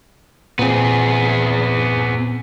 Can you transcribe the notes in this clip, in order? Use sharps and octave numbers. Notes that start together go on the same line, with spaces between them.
A#2 B3 C4 G#4